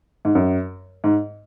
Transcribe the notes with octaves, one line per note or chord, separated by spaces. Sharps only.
G#2
F#2
G#2